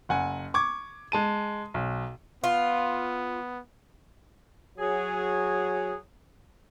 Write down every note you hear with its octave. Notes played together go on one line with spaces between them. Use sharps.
F#1 F#5 G#5
C#6 D6 G#6
G#3 A5 D#7
B1
B3 F4
F#3 G#4